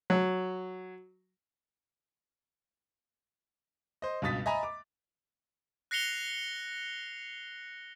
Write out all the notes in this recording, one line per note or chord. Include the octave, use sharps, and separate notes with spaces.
F#3
C5 D#5
C#2 G2 B2 D#6 A6 B6
D#5 E5 G#5 A#5 B5
D6
F#6 A#6 C7 C#7 F7 G7